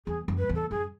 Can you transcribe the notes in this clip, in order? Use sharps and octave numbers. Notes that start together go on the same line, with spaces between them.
E2 G#4
F#2
B4
E2
A4
F#2 G#4